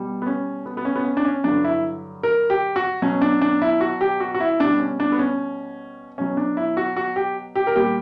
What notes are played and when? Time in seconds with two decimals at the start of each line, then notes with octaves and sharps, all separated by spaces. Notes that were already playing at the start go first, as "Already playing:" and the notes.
Already playing: B2 G3
0.22 B3
0.27 C#4
0.66 B3
0.77 B3
0.85 C#4
0.96 B3
1.05 C#4
1.17 D4
1.25 C#4
1.44 G2 D3 F#3 D4
1.64 E4
2.23 A#4
2.50 G4
2.76 F#4
3.02 B2 F#3 C#4
3.22 D4
3.41 D4
3.62 E4
3.81 F#4
4.01 G4
4.20 F#4
4.35 F#4
4.40 E4
4.60 B2 G3 D4
4.80 C#4
5.00 D4
5.12 B3
5.19 C#4
6.18 B2 F#3 C#4
6.37 D4
6.57 E4
6.77 F#4
6.96 F#4
7.16 G4
7.55 G4
7.67 A#4
7.75 A#2 G3 G4